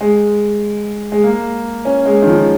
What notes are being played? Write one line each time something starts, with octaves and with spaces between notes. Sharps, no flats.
G#3
G#3
A#3
C#4
G#3
D#3
F3